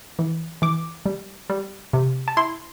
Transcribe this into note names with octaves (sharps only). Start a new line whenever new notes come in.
E3
E3 D6
G3
G3
C3
A5
E4 C6